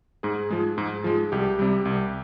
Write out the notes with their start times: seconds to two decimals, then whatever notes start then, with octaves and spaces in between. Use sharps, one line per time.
0.23 G#2 G#4
0.51 F3 G#3
0.78 G#2
1.04 F3 G#3
1.32 C2 G4
1.59 C3 G3
1.85 C2